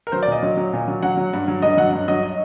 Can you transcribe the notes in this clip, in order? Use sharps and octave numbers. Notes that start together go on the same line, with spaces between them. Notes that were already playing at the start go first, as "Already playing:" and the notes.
A#4
F#3 C5
D5
A#2 D#5
F#3
F#3
A#2
F#3
F#3 F#5
F#3
G2
F#3
G2 D#5
F#3 F#5
G2
F#3 D#5
D#5